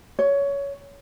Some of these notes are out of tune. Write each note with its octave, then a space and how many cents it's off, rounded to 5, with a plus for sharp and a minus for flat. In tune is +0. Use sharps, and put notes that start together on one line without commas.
C#5 +15